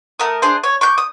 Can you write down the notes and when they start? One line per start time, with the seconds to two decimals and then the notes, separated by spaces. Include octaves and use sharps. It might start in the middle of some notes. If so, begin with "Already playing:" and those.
0.19 A3 A#4 D#6
0.42 D4 G#4 C5
0.64 C#5
0.81 C#6 D6 G6
0.98 D#6